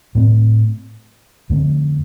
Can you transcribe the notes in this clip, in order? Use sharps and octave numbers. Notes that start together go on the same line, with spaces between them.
A2 A3 C4
F2 D3 A3 C4